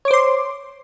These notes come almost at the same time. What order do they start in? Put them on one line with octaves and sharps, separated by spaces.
C#5 D6 C5 C6